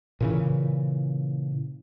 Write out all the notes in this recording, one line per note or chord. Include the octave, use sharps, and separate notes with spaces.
A#2 C#3 E3